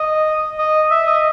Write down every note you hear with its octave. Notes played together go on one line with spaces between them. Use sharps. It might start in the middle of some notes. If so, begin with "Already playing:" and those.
Already playing: D#5
D#5
E5
D#5